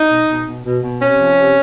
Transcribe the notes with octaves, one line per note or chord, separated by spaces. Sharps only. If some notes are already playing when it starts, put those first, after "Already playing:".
Already playing: D#4
B2
B2
B2
B2
B2
C3 C#4
F3
C3